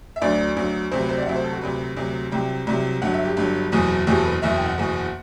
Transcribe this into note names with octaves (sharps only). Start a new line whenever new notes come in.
E5
D2 D3 F#3 D5
D2 D3 F#3
D2 C3 F#3 C5
B4
C5
D5
F#5
D2 C3 F#3 E5
C5
A4
F#4
D2 C3 F#3 B4
D2 C3 F#3
C2 C3 F#3 G5
C2 C3 F#3
G1 G2 F#3 F#5
E5
G4
G1 G2 F#3
F#1 E2 B2 F#3
F#1 E2 B2 F#3 G4
A4
B4
F#1 E2 B2 E5
G5
F#5
F#1 E2 B2